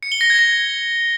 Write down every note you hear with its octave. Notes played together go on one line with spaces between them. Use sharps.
C#7
G7
A#6
G#6
A#6